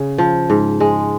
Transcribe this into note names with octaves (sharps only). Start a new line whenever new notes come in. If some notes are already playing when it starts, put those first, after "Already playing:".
Already playing: C#3
F3
G#2
G#3